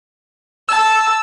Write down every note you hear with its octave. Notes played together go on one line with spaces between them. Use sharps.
A5 E6